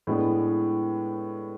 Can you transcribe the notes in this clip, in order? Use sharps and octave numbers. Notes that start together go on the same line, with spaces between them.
A2 G#3 B3 D4